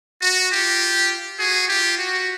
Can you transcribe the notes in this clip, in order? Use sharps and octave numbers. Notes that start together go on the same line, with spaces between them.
F#4
F4 G4
F#4 G#4
F4 G4
F#4